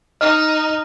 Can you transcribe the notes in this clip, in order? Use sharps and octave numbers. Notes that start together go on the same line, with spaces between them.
D#4 D#5 F6